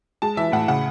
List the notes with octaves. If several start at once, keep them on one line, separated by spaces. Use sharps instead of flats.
G#3 A5
E3 E5
A2 F#5
C#3 F#5